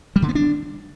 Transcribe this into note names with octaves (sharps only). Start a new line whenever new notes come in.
G3
D3
B3
D4